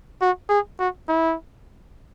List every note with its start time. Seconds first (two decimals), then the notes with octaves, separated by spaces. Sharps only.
0.22 F#4
0.50 G#4
0.79 F#4
1.08 E4